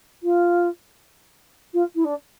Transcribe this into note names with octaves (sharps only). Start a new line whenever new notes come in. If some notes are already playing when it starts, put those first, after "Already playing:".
F4
F4
E4
D4